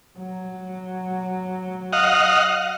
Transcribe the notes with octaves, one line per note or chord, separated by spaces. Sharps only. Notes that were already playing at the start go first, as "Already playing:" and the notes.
F#3
D#5 F5 F#5